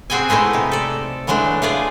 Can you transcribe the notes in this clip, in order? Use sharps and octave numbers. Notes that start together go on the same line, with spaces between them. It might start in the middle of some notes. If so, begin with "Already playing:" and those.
C4 F#4 G#4 G5 G#5
B2 G#3 A3 D#4 E4
C3 D#4
A4 D5
E3 F#3 G#3 A3 D4
A3 F4 G#4 D5